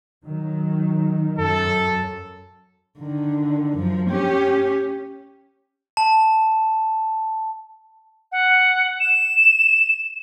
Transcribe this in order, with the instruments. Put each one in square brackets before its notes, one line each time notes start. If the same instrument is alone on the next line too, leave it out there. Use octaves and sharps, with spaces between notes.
[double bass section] D#3 F#3
[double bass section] F#2 [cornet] A4
[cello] D3 D#3
F#2 F3
C#4 G4
[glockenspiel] A5
[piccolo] F#5
E7